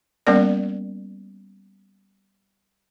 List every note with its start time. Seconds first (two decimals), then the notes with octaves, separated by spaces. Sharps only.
0.27 G3 A#3 B3 C#4 A#4 D5